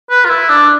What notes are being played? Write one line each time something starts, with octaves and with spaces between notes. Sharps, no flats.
B4
F4
E4
D4